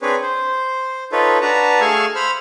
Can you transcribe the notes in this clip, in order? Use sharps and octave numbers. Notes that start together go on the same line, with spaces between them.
C4 D4 G#4 B4 C#5
C5
D#4 F4 A4 B4 C#5
D4 F#4 B4 A5 A#5
A3 G#4 F5 G#5 C#6 E6
C5 B5 E6 F6